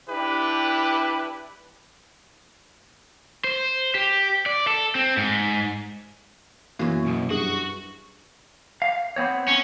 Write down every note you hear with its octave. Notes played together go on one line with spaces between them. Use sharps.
D4 E4 G4 B4
C5
G4
D5
A4
C4
G#2
F#2 B2 E3 A#3
B1
G2 F#4 G#4
F5
B3 C4 C#5
C#4